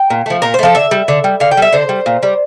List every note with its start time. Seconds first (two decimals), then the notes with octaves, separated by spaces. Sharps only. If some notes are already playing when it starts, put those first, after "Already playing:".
Already playing: G5
0.10 A#2
0.26 F3 A3
0.42 A#2 A#4
0.54 A3 C5
0.63 F3 A4
0.75 D3 E5
0.91 G3
1.08 D3
1.24 G3
1.40 D3 F5
1.51 G5
1.57 G3 E5
1.73 D3 C5
1.89 G3
2.06 A#2
2.23 G3